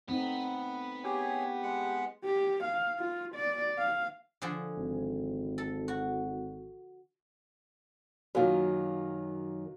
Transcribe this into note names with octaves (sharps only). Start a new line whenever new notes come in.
A3 B3 C4 D#4
G4 G#4 C#5
G#3 F#5 F#6
G4
F5
F4
D5
F5
D3 F3 G#4
G#1
A4
F#4
F#2 D#3 F#3 A#3 F4